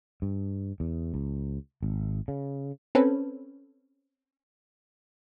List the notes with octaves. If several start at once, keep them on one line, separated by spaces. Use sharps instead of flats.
G2
E2
C#2
G#1
C#3
C4 C#4 A4 B4